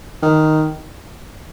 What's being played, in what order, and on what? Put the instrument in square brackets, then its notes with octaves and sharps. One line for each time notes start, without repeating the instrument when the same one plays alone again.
[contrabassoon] D#3